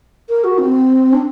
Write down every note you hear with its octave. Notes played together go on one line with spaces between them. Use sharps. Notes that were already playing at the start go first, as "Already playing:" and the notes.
A#4
F#4
C4
D4